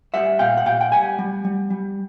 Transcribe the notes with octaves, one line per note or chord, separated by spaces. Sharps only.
G3 E5 F#5
A#2 F5 G5
F#5
A#2 F5 G5
G5
G3 F#5 G#5
G3
G3
G3